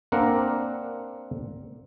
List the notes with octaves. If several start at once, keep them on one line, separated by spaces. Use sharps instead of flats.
A#3 C4 D4 A#4 F#5